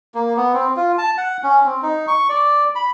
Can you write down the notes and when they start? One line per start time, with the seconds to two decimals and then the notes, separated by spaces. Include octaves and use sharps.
0.14 A#3
0.37 B3
0.54 C4
0.77 F4
0.98 A5
1.18 F#5
1.43 C#4
1.65 C4
1.82 D#4
2.08 C#6
2.29 D5
2.75 B5